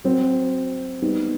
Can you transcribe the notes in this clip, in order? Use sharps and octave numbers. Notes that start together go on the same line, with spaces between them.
F#3 C4 F#4
G3 B3 D#4